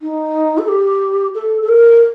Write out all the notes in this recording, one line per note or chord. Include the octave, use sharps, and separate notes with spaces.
D#4
A4
G4
A4
A4
A#4